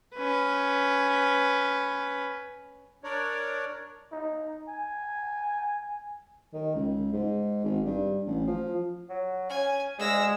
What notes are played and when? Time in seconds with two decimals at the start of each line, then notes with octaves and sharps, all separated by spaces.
0.15 C#4 B4
3.04 D4 A#4 C#5 D5
4.12 D#4
4.68 G#5
6.53 D#3
6.75 C#2
7.13 G#2
7.64 G#1
7.85 G2
8.26 A1
8.47 F3
9.09 F#3
9.49 C#4 G#5
9.99 D2 G#3 E6 A#6